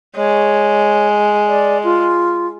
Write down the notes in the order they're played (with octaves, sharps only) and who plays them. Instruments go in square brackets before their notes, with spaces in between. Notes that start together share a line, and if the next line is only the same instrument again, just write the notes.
[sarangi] G#3 [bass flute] C#5
[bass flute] D5
F4